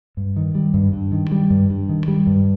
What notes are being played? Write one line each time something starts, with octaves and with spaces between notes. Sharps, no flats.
G2
D#3
G3
G2
G2
D#3
G3
G2
G2
D#3
G3
G2